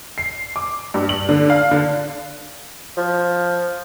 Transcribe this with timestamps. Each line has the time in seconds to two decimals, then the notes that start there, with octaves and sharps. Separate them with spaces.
0.18 C7
0.56 D6
0.94 G2
1.09 F#7
1.29 D3
1.50 F5
1.71 D3
2.97 F3